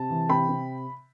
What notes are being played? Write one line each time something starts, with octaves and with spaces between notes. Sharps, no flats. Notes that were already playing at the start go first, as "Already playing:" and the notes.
Already playing: C3 A5
E3
C3 G5 B5
C3